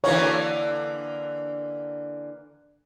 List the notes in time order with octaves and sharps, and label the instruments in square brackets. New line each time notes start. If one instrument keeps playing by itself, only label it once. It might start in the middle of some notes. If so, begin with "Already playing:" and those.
[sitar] D3 E3 A#3 [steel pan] C#5